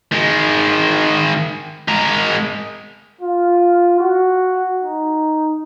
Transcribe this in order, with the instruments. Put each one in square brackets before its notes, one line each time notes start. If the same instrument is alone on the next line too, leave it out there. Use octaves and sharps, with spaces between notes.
[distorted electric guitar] D#3 G#3
G#3 A#4
[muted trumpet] F4
F#4
D#4